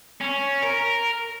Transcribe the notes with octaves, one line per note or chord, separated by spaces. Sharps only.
C#4
A#4